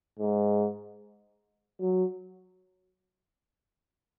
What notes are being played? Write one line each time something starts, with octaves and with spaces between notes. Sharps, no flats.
G#2
F#3